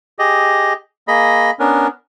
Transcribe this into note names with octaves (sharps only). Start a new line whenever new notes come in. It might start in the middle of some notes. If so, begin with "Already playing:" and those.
G4 G#4 D#5
A#3 G#4 D#5 B5
B3 C#4 D4 A#4